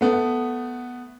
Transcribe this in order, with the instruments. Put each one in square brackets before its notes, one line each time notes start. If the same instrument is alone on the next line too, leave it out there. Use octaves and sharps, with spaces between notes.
[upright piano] A3 B3